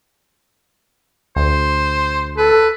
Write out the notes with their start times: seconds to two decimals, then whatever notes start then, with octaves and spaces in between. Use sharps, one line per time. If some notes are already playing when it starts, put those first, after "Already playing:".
1.36 D2 C5
2.38 A4 B4